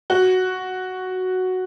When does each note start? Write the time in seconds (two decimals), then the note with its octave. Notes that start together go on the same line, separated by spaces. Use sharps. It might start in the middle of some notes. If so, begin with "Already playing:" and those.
0.10 F#4